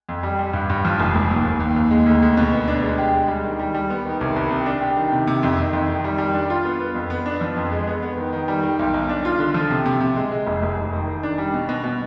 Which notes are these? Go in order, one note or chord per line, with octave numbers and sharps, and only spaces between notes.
F2
G3
G3
G2
G2
F3
F1
F1
D#2
D#2
D#2
D#2
G#3
D2
D2
B2
B3
D4
G#3
G4
G#3
G3
D#3
G3
G3
B3
D#3
C2
C2
C3
D4
G4
D#3
C3
C3
F2
D#3
F2
D#3
G3
G3
D4
F4
B3
B3
F2
B3
D4
F3
F2
G#3
B3
B3
D#3
D#3
G3
D#3
B1
B1
D4
F4
D3
F3
C3
C3
C3
G#3
G#3
F1
F1
F1
D#3
D#3
D4
G3
B2
B2
B2